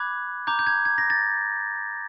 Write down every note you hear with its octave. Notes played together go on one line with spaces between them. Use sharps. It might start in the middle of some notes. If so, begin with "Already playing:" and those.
Already playing: B5 D6 F#6 G#6
A#5 D6 G6
G6
G#6
G#6
A#6
A6